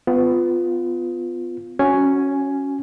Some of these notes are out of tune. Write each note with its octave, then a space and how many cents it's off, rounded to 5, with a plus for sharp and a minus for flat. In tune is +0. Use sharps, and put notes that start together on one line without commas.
B3 +25 F4 +0
C#4 +0 F#4 +0 G#5 +5